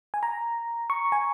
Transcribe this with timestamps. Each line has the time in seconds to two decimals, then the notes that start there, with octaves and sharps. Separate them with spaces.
0.14 G#5
0.23 A#5
0.90 C#6
1.12 G#5